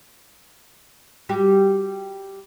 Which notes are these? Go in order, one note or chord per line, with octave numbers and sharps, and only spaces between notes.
G3 F#4 G4